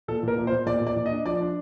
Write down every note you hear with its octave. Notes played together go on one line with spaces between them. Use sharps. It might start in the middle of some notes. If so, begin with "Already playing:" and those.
A#2 A4
A#2 A#4
A#2
C5
A#2
A#2 D5
A#2
D5
A#2
D#5
D4
F3 D5
D4